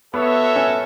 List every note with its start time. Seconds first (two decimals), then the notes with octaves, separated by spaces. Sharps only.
0.14 B3 F#4 A4 C#5 E5
0.56 C#4